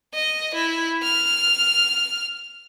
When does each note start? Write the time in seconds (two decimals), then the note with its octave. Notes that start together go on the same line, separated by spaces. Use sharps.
0.14 D#5
0.54 E4
1.03 F6